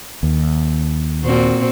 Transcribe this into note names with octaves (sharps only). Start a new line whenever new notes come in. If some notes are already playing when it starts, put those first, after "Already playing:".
D#2
A#2 C4 F#4